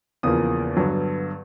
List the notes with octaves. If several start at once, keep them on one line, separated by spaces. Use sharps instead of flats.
E2 C#3 F3 A#3 D#6
G2 D3 F#3 B3